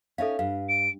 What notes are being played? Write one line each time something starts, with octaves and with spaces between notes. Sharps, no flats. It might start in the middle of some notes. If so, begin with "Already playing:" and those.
C#4 D#4 A4 C#5 E5 F5
G2 F5
D7